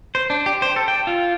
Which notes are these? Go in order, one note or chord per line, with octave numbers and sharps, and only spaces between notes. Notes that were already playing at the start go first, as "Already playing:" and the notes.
C5
D4
G4
C5
A4
G5
F4